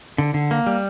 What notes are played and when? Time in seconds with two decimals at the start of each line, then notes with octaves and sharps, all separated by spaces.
0.18 D3
0.34 D3
0.51 A#3
0.66 G3